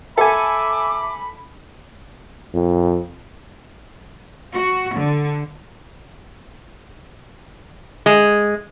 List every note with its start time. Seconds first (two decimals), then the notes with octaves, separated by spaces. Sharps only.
0.18 A4 E5 G#5 B5 D6
2.54 F2
4.54 F#4
4.94 D3
8.06 G#3